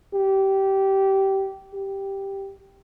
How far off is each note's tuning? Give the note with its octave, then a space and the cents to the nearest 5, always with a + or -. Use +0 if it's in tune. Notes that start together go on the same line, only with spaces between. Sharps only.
G4 -20
G4 +0